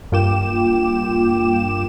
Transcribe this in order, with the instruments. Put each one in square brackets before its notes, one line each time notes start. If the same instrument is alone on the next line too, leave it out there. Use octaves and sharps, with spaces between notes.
[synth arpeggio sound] G2 A#3 F4 G5 D6 E7